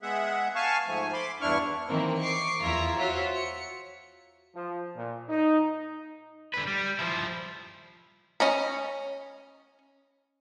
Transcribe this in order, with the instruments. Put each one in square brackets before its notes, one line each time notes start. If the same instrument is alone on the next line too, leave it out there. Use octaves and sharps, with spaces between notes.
[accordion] G#3 B3 G#4 E5 F#5
F5 G#5 A5 C#6
G#2 F3 A3 G#5
B5 C6 D6
E2 G2 D4 E4 C#6 F6
[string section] D#3 E3 A#3 C4
C#6 D6 C7
E2 E4 F4 E5 A#5
F4 F#4 C5 C#5 E5
C#7
[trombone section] F3
A#2
D#4
[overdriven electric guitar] D3 B4
G3
F3 E4
[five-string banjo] C#4 D#5 B5